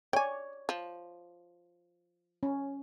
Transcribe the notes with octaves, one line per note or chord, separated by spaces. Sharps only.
C#5 D5 G5 G#5
F3
C#4